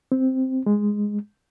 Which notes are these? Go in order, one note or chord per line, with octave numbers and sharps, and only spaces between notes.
C4
G#3